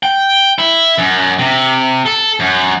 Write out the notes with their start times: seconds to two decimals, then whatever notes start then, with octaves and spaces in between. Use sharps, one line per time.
0.03 G5
0.58 E4
0.98 F#2
1.39 C3
2.06 A4
2.40 F#2